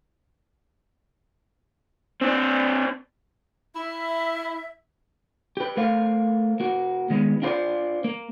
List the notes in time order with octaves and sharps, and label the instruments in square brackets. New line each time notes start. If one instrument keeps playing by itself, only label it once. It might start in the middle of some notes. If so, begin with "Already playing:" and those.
[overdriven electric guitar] C4 D4
[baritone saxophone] E4 [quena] E5
[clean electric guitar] G4 B4
A3 A#4 C5 F5
A#3 F#4
D#3 G#3 B3
D4 F4 F#4 B4 C5 D5
A#3